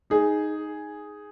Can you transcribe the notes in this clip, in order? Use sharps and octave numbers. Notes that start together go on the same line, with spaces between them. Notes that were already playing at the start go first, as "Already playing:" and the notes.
D#4 G#4